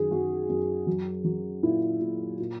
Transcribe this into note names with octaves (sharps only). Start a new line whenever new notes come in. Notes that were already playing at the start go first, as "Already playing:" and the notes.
Already playing: F#2 D#3 G#4
F#2 F#4
F#2
F#3
F#3
A#2 E4
A#2
A#2